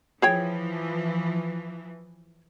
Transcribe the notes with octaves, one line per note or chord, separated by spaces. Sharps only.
E3 F3 G#4 C#5 G5